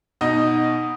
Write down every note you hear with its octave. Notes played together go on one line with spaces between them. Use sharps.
B2 D#4 F#4 D#5